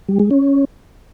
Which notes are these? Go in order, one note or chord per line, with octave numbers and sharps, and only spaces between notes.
G3
G#3
C#4